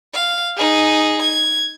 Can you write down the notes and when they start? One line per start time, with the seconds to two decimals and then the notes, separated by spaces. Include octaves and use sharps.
0.14 F5
0.57 D#4 G#4
1.22 G#6